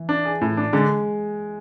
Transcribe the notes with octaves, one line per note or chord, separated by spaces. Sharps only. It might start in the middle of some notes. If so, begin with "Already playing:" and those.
Already playing: E3
D4
G#4
A2
D4
D3 G#3